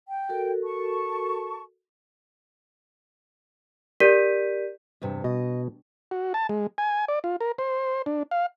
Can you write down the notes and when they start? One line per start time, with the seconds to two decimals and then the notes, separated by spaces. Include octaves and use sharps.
0.08 G5
0.29 F#4 A4 A#4
0.64 A5 C#6
4.00 G4 A#4 D5 G6 B6 D#7
5.02 E2 G2 C3
5.24 B2 D#5
6.11 F#4
6.34 A5
6.49 G#3
6.78 G#5
7.08 D5
7.24 F4
7.41 A#4
7.58 C5
8.06 D4
8.31 F5